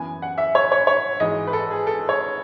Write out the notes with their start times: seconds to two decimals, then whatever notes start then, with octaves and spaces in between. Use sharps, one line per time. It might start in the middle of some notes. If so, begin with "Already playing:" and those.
Already playing: F#2 E3 B3 G#5
0.22 F#5
0.38 E5
0.55 C#5
0.72 C#5
0.87 C#5
1.20 G#1 G#2 E3 G#3 D#5
1.47 B4
1.53 A4
1.71 G#4
1.87 A4
2.09 C#5